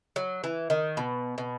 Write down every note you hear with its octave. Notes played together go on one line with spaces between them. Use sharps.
F#3
E3
D#3
B2
B2